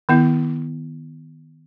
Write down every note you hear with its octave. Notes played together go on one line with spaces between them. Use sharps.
D#3 B3 E4